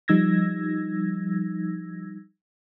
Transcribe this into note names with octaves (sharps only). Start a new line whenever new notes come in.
F3 G3 D#4 E6 G#6 A#6